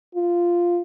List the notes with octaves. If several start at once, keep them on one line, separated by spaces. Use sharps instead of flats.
F4